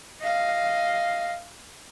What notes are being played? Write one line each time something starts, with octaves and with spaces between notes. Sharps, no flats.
D#5 F5